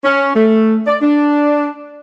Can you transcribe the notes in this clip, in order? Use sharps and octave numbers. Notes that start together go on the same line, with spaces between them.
C#4
A3
D5
D4